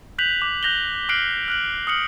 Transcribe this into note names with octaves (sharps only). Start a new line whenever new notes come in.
F#6 G6 B6 F7 F#7
D6
F#6 G6 A#6 F7 G7
D6 F6 F#6 C7 D7 F#7
F6 F#6 F#7
D#6 F6 C#7 F#7